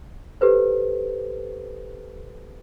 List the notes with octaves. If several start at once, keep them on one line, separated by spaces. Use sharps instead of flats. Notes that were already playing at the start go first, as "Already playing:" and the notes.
G4 A4 B4 C5